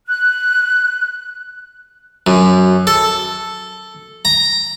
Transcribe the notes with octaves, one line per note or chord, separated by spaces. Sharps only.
F#6
F#2
A4
A#5